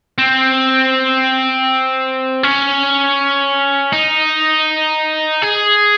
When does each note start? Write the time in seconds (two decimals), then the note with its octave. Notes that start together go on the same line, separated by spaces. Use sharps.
0.18 C4
2.43 C#4
3.93 D#4
5.42 G#4